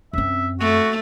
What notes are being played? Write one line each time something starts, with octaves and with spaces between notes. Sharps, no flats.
F#2 C4 E5
A3 F#4